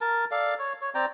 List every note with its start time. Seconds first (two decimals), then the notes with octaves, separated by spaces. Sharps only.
0.01 A#4 A5
0.31 A4 D5 F5
0.59 C#5
0.81 C#5
0.95 C4 D5 G5 A#5